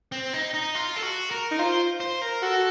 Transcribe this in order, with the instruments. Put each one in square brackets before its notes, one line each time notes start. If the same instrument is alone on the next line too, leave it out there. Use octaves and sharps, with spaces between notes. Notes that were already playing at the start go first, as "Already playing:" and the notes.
[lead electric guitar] C4
D#4
D#4
F4
A4
F#4
A#4
[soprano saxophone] D#4
[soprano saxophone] F4 [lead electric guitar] C5
[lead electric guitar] C5
A#4
[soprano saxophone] F#4 [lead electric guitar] A4